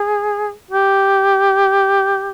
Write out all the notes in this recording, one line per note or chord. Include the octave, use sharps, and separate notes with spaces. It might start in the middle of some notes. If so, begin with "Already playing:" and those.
Already playing: G#4
G4